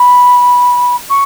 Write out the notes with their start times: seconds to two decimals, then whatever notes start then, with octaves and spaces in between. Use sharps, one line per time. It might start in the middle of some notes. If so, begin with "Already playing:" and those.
Already playing: B5
1.10 C#6